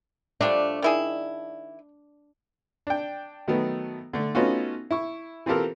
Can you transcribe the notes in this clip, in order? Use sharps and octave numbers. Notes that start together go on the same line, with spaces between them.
F3 G3 A3 D4
D#3 E4 G#4
D4 G5
D#3 F#3 A3 B3
D3 A3
A3 B3 C#4 D#4 F4 F#4
E4 C#6
E3 C4 F4 G4 A4 A#4